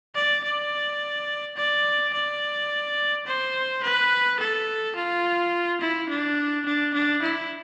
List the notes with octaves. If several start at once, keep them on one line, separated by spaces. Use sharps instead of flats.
D5
D5
D5
D5
C5
B4
A4
F4
E4
D4
D4
D4
E4